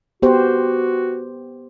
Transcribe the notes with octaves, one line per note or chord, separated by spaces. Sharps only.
B3 F#4 G4 C5